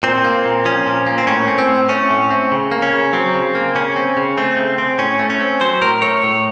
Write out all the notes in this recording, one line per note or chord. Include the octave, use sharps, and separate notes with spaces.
A#2 C4
A#3
A#2
F3 C#4
A#2
A#3
C4
A2 C#4
C4
C4
A2
A3 C#4
A2
C4
C#3
A#3
C#4
C#3
F#3 C4
C#3
A#3
C#3 C#4
C4
C#3
A3 C4
C#3
C4
A2 C#4
A3
C#4
C4
F#3 C5
A2 A#4
A3 C#5
A2